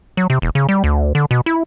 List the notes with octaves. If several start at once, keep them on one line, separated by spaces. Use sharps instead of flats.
F#3
C3
E1
C#3
G3
D2
D3
B2
E4